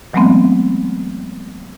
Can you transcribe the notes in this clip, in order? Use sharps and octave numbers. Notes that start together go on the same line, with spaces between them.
E3 F#3 G#3 A3 B3 C4